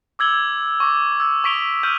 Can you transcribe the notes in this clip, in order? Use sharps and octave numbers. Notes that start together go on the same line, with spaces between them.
D6 E6 G#6 F#7 G7
C#6 D6
E6 G#6
C#6 D#6 B6 D7 F7 G7
D6 E6 F6 G6 D#7 F#7